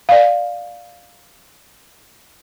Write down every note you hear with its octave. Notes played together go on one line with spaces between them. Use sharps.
D5 F5